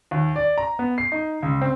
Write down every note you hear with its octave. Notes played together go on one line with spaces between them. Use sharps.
D#2
D5
A#5
B3
C7
D#4
C#2
C4